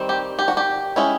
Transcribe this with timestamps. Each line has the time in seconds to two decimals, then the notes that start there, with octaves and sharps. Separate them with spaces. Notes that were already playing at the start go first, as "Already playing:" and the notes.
Already playing: D#3 G3 C4
0.09 G4
0.39 G4
0.48 F#4
0.57 G4
0.96 G#3 C#4 E4